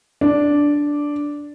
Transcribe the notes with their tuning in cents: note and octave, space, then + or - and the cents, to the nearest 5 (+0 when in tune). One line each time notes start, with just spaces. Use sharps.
D4 -5